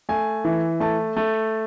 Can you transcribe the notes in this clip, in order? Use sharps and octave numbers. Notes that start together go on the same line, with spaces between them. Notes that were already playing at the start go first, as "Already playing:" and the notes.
A3 G#5
E3
A3 A5
A3